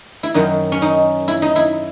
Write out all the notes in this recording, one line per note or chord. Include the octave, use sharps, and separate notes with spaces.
E4
F#2 D#3 F#3 D#4
C#4
D#4
E4
D#4
E4